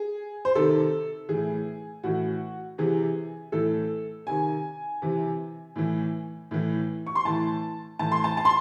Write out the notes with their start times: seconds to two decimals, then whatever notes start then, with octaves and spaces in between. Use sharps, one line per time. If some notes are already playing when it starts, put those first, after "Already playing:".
Already playing: G#4
0.45 C5
0.55 C3 D#3 A4
1.29 A2 E3 G#4
2.04 A2 E3 F#4
2.78 C3 E3 G#4
3.52 A2 E3 A4
4.27 C3 D#3 G#5
5.02 C3 E3
5.76 A2 E3
6.51 A2 E3
7.07 C#6
7.15 C6
7.25 A2 E3 A5
7.99 A2 E3 A5
8.12 C6
8.24 A5
8.37 A5
8.45 C6